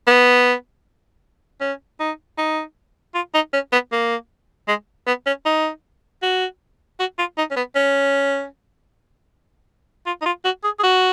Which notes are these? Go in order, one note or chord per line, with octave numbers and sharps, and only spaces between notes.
B3
C#4
D#4
D#4
F4
D#4
C#4
B3
A#3
G#3
B3
C#4
D#4
F#4
F#4
F4
D#4
C#4
B3
C#4
F4
D#4
F4
F#4
G#4
G#4
F#4